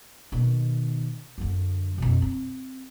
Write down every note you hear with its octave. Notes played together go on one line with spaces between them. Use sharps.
B2 D#3
F#2 D3
F2 B2
C4